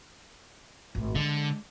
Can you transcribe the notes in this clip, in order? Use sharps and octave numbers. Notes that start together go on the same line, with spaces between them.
G#1 A2
D3 G#3